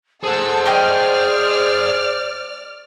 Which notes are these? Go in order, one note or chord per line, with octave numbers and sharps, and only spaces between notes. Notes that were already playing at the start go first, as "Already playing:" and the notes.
G#4 A4 C5 F#5 E6
A3 D5 D#5 G5 F6